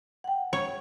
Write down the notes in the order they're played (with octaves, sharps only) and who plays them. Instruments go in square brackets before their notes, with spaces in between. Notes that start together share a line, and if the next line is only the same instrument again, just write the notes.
[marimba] F#5 G5
[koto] C#5